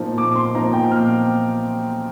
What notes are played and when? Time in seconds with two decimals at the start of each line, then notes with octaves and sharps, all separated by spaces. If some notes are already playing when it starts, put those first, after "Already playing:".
Already playing: A#2 F3 A#3 D#4
0.18 A#2 D6
0.35 C6
0.54 F3 A#3 D#4 A#5
0.73 G5
0.91 A#2 F6